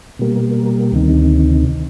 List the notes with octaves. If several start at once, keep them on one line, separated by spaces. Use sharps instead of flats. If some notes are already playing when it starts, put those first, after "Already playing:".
B2 G3 A#3
D2 C3 D#3